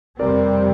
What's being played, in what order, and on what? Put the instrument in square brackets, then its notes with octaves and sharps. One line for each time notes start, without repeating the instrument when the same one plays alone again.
[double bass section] F2 C3 G3 C4 [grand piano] A#4 D5